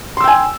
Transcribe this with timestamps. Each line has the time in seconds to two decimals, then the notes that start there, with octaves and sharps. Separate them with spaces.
0.17 C6
0.21 E6
0.24 G5
0.28 G#5